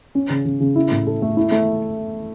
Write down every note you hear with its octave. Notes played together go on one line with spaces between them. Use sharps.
C#4
C#3
C#3
C#3
E4
A2
A4
A3
E4
A3